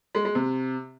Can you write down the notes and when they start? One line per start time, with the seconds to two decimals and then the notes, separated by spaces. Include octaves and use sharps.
0.15 G#3
0.25 G#3
0.35 C3